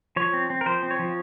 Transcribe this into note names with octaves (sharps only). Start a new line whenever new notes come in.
F3 C#5
C4
C4
A#4
F3 C5
C4
C#5
F3